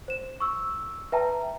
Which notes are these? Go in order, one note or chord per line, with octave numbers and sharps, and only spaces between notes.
C5 E7
C#6 E6
B4 E5 G5 A5 A#5